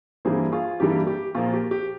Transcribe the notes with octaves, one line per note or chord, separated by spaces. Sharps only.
G2 E3 G3 A#3 G#4 C5
F4 G#4
G2 E3 G3 A#3 G4
G4
A#2 F3 A#3 F4 G#4
G4
G4